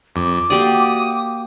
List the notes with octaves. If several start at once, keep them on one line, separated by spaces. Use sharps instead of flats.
F2 D6
A#3 F#4 G4 D5 D#6